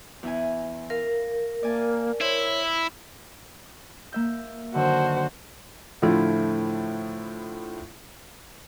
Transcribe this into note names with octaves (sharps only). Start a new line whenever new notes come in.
E2 E4 G#5
A#4 F5
A#3 D5 G#5 A5
E4 C5 C#5
A#3 E5 G6
F#2 D3 D#3 F#4 C5
A2 D3 F3 A3 E4 F4